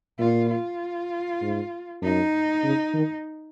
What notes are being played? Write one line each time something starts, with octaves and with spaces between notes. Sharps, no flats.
A#2 F4
F4
G#2
F#2 D#4
C#3
D#3